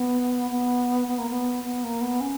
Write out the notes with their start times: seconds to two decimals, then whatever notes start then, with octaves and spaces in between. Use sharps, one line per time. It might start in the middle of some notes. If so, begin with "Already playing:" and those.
Already playing: B3
0.51 B3
1.08 B3
1.18 A#3
1.30 B3
1.64 B3
1.83 A#3
2.01 B3
2.21 C#4